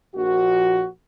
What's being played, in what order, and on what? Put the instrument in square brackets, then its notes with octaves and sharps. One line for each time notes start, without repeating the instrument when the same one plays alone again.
[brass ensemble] A#1 A#2 F#4